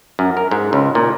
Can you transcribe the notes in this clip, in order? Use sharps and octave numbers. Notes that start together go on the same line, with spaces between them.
F#2
A#4
G#2
C#2
A#2